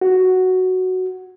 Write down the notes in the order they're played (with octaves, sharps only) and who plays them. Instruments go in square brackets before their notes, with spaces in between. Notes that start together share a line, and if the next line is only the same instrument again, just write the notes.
[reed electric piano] F#4